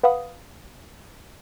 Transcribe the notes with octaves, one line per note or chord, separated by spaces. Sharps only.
B4 F5 F#5 B5 D#6